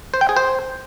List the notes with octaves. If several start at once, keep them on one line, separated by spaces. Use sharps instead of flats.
C5
G5
G#4
C5